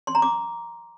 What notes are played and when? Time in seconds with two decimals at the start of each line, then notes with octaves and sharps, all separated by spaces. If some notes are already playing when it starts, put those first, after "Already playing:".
0.07 C6
0.15 A#5
0.22 D6